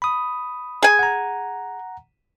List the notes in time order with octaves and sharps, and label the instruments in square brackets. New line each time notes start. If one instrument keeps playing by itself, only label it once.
[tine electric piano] B5 D#6
[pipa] G#4 G#5
[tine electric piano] F#5 A#5